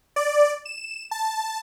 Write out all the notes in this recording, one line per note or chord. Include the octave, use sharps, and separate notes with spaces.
D5
E7
A5